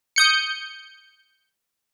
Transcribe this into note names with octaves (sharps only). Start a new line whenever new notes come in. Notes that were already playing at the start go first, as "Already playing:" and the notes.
D#6 G6 C#7